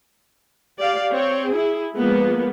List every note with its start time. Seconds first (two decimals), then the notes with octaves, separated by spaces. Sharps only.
0.78 G4 D5 F5
1.12 C4 C#5
1.49 E4 G#4
1.96 F3 G#3 A#3 B3